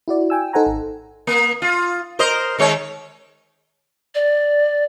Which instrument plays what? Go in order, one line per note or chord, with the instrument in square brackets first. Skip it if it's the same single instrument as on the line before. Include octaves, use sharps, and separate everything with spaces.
[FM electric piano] E4 F#4 D5
G5 G#5 E6
D#4 A4 C5 F#5 G#5 A#5
G#1
[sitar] A#3
F4
A#4 C5 D#5
D#3 G#3 C#5
[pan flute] D5